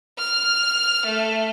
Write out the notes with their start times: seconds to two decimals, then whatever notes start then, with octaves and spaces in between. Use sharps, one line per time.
0.18 F6
1.06 A3